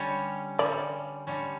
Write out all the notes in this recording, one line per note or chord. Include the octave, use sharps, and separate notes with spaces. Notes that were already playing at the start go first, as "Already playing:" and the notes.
Already playing: D3 G3 C#4
D3 G3 C#4 D5
D3 G3 C#4